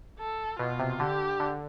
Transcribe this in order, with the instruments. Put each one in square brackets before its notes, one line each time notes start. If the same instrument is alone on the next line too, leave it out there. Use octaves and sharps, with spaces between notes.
[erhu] A4
[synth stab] B2 [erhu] F4
[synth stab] C3
[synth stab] D3 [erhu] G4
[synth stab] D3